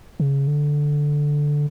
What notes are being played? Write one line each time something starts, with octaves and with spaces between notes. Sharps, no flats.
C#3
D3